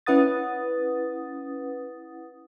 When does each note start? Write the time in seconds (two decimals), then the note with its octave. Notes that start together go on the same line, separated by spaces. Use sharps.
0.06 C#4 E4 B4 F#5 D#6 A6